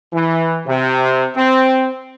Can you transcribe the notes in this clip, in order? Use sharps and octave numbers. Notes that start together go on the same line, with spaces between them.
E3
C3
C4